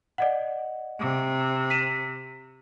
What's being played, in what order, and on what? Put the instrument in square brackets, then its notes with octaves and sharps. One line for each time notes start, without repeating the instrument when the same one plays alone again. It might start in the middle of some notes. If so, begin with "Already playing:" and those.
[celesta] D5 D#5 F#5
[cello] C3
[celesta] B6 D#7 E7